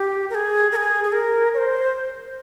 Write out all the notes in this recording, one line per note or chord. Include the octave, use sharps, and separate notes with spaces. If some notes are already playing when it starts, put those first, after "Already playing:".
Already playing: G4
A#4
G#4
A#4
G#4
G#4
A#4
C#5
C5